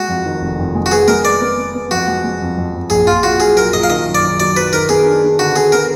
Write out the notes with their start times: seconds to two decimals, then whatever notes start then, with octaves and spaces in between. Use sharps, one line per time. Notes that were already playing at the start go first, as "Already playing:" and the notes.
Already playing: G#3 F#4
0.08 F2
0.25 D#3
0.42 F1
0.58 F2
0.75 G#3
0.86 F#4
0.91 B3 G#4
1.08 G#3 A#4
1.24 B3 D5
1.41 B3
1.58 B3
1.74 B3
1.91 F2 F#4
2.08 G#3
2.24 G#3
2.41 F2
2.57 F2
2.74 F2
2.90 A#1 G#4
3.07 A#1 F4
3.23 A#2 F#4
3.40 F#3 G#4
3.57 F#3 A#4
3.73 A#2 D#5
3.83 F5
3.90 D#3 D#5
4.07 F#2
4.15 D5
4.23 D#3
4.40 F#3 D5
4.57 F#3 B4
4.73 D#3 A#4
4.89 B3 G#4
5.06 D4
5.23 D4
5.39 D3 F#4
5.56 B3 G#4
5.72 B3 A#4